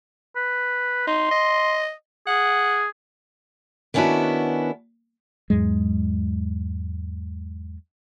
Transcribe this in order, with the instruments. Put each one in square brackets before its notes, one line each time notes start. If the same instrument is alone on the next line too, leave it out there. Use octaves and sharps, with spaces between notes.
[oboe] B4
[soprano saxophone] D#4 [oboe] C6
[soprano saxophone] D#5
[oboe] G#4 [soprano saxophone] F#5
[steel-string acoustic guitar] D#3 B3 C#4 D4 E4 F#4
[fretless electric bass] E2 G#2 F#3 G#3